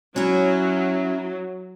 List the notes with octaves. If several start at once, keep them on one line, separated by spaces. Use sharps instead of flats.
F#3 C#4 E4